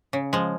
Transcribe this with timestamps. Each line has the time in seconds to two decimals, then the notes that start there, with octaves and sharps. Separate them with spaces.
0.13 C#3
0.33 F3 G#3